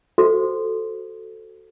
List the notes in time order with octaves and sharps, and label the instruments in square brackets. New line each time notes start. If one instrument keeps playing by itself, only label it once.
[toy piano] F#4 A4 C5